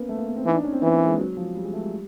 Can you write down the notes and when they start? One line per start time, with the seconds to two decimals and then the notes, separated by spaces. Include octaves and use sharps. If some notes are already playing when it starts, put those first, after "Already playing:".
Already playing: A#3 B3 C#4
0.09 A3
0.17 A#3
0.27 B3
0.36 C4
0.46 E3 D#4
0.55 D4
0.64 C#4
0.72 C4
0.82 E3 B3
0.94 A#3
1.06 G#3
1.19 F#3
1.37 F3
1.55 G3
1.64 G#3
1.73 A3
1.83 G3